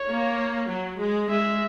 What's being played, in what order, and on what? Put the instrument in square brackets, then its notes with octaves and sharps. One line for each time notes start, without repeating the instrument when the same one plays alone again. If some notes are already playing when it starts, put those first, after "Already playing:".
Already playing: [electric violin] C#5
[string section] A#3
F#3
G#3
[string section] G#3 [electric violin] E5